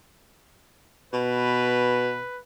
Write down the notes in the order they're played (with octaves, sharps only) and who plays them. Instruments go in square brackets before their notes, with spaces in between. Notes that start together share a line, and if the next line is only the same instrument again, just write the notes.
[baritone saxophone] B2 [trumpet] B4